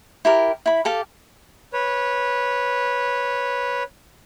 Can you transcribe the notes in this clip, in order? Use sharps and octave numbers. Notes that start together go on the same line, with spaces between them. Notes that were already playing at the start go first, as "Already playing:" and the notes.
E4 G4 A#4
E4 B5
G4 A4 F5
B4 C#5